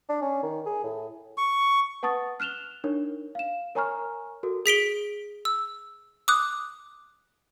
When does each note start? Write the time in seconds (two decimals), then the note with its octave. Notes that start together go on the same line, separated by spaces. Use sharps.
0.09 D4
0.22 C#4
0.43 D#3
0.66 G#4
0.84 A2
1.38 C#6
2.03 B4 F#5 A5 C#6 D#6 A6
2.40 F6 F#6 E7 F7 G7
2.84 D4 D#4 A#4 C#5
3.35 F5 E7
3.75 A#4 C#5 G#5 A#5 C#6 F6
4.43 F#4 A4 A#4
4.66 G#4 B6 D7 G7
5.45 E6
6.28 D6 D#6 F#6